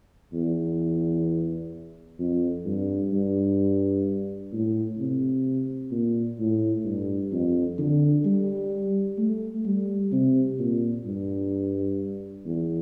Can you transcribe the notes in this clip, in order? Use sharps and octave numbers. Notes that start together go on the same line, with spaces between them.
E2
F2
G2
G2
A2
C3
A#2
A2
G2
F2
D3
G3
A3
G3
C3
A#2
G2
E2